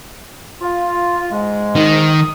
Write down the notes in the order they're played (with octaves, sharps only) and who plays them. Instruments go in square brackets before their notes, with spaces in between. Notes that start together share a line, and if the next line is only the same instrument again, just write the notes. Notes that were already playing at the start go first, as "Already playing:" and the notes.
[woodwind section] F4
G#2 G#3
[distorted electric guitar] D#3
[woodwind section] D#6